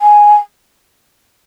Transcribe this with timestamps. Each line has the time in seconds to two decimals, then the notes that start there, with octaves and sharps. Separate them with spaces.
0.01 G#5